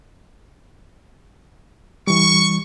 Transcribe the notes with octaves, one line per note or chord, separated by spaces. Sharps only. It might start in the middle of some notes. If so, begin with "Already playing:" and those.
E3 G3 C#6